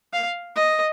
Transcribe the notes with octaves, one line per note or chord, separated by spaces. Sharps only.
F5
D#5